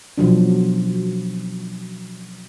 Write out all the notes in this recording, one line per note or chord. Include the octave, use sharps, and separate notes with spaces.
B2 F3 F#3 D4